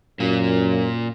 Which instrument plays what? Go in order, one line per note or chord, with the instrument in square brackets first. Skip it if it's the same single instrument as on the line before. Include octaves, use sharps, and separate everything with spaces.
[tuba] F#2 [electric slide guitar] A#2 A#3